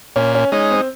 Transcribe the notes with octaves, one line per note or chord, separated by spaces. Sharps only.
A#2 C#4
C#4
G#3 C#4 D#4
C4